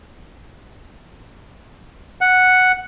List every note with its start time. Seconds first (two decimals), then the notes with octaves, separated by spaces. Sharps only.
2.21 F#5